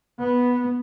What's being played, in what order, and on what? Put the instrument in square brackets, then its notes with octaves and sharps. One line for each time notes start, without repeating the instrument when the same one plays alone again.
[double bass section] B3